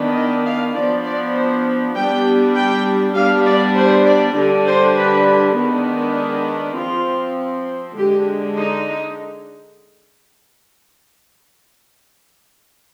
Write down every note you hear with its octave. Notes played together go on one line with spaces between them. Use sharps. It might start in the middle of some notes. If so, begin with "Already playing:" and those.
Already playing: D#3 B3 D4
D#5
F5
F3 B3 D4 D5
D5
C5
G3 B3 D4 G5
G5
G3 B3 D4 F5
D5
C5
D5
D3 G3 D4
C5
B4
D#3 G#3 B3 D4
G#4
F3 C4 F4
D3 G#3 D4 G4
D#4